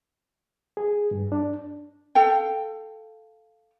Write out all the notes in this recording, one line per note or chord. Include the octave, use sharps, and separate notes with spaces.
G#4
G2
D4
A4 F5 G5